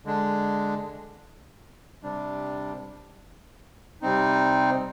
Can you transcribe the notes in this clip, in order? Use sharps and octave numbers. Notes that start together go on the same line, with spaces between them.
D3 G#3 D4
C3 G3 D4
C3 G3 C4 D#4